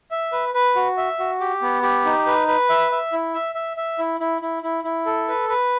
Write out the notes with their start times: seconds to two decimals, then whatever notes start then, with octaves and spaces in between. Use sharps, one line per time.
0.11 E5
0.32 B4
0.54 B4
0.75 F#4
0.97 E5
1.19 F#4
1.40 G4
1.62 B3
1.83 G4
2.05 D#4
2.26 B4
2.47 B4
2.69 E5
2.91 E5
3.12 E4
3.34 E5
3.55 E5
3.77 E5
3.99 E4
4.20 E4
4.42 E4
4.63 E4
4.84 E4
5.06 A4
5.28 B4
5.49 B4